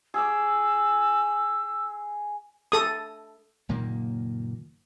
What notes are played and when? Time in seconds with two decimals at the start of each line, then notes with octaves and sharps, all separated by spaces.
0.14 G#4 D6 E6
2.72 A4 D#6
3.69 F#1 A#2 D#3 A#3